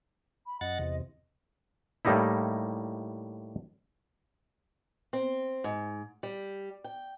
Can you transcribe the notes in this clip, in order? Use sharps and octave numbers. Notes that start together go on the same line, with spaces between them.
B5
F#2 D#5 F#5 A6
E2 C3
A2 G3 A#3 D#4 E4
C4
G#2
G3
G5